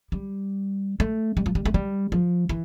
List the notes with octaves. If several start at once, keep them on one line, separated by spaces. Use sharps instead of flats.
G3
A3
G3
F3
G3
A3
G3
F3
E3